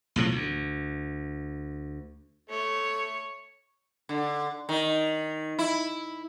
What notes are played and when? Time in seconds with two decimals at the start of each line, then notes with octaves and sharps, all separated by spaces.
0.16 B1 A2 C3 F3
0.32 D2
2.50 A3 C#5
4.09 D3
4.69 D#3
5.59 E4